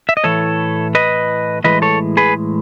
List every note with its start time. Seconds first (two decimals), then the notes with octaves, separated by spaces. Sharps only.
0.09 E5
0.17 D#5
0.24 A2 E3 A3 A4 C#5
0.95 B4 D#5
1.64 A2 E3 G#3 B4 D#5
1.82 A4 C#5
2.17 G#4 B4